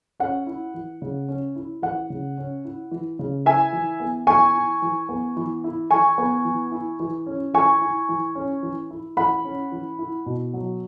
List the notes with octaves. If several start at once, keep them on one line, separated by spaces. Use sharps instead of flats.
C#4 F#5
E4
E3
C#3
C#4
E4
E3 F#5
C#3
C#4
E4
E3
C#3
E4 E5 G#5
E3
B3
E3 G#5 C#6
E4
E3
B3
E3
E4
E3 G#5 C#6
B3
E3
E4
E3
C#4
E3 G#5 C#6
E4
E3
C#4
E3
E4
E3 F#5 B5
C#4
E3
E4
B2
F#3